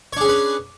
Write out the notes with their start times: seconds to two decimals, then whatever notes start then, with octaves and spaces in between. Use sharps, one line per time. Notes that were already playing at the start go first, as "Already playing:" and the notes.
0.13 C#5
0.17 D4
0.21 G#4
0.25 C#4
0.29 B4